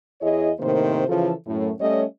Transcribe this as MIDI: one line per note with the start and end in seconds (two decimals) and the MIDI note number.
0.21 0.50 40
0.21 0.50 64
0.21 0.50 68
0.21 0.50 73
0.21 0.50 75
0.60 1.02 45
0.60 1.02 48
0.60 1.02 51
0.60 1.02 58
0.60 1.02 72
1.08 1.31 49
1.08 1.31 52
1.08 1.31 53
1.08 1.31 65
1.08 1.31 69
1.46 1.71 42
1.46 1.71 45
1.79 2.04 55
1.79 2.04 57
1.79 2.04 61
1.79 2.04 73
1.79 2.04 75